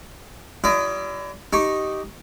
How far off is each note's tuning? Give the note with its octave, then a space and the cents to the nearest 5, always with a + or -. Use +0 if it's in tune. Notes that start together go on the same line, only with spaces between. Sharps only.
G3 -35 E4 +35 D#5 +0
D#4 +0 G4 -15 C#6 -20